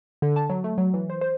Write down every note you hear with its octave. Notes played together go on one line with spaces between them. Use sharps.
D3
A5
F#3
A3
F#3
E3
C5
C5